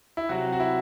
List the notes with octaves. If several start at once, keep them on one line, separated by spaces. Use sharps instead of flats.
E4
C3 F#3 F#4
F#4
E4